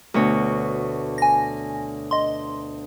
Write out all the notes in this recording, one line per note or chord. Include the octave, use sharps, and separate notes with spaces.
D2 B2 C#5
G#5 A#6
D#5 C6